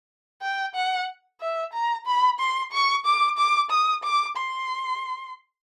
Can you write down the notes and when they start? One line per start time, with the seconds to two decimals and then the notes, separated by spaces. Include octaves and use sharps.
0.42 G5
0.75 F#5
1.41 E5
1.73 A#5
2.06 B5
2.39 C6
2.72 C#6
3.05 D6
3.38 D6
3.70 D#6
4.03 D6
4.37 C6